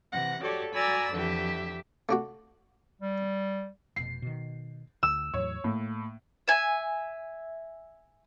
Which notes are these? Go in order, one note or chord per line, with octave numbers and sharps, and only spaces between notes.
C3 E3 F#5 A#6
F#4 G4 A4 C#5 D5
F#4 D5 G#5 A#5 B5 E6
F2 D3 E3 G4 E5
A3 D4 F#4
G3
F1 B2 C7
B2 D#3
D2 E6
E2 A2 F#3 C#5
A2 A#3
E5 G#5